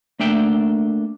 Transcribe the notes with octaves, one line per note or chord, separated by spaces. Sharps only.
A3 A#3 D4 E5 G5